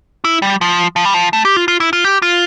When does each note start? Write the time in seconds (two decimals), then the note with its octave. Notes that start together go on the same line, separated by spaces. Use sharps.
0.24 E4
0.42 G3
0.61 F3
0.96 F3
1.05 G3
1.14 F3
1.33 A3
1.45 G4
1.56 F4
1.68 F4
1.80 E4
1.93 F4
2.04 G4
2.22 F4